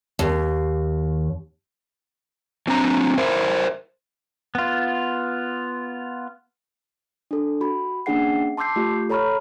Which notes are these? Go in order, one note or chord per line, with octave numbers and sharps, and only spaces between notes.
D#2
F#3 C4 D4 A#5
A#4 C5 E5
B3 F4
D4 A4
F#4 B5
A#3 C#4 D4 G#4 F#5 C7
A5 C6 D6 E6 G6 C7
A3 F4 G4
A4 C#5 A#5 B5 C#6 F6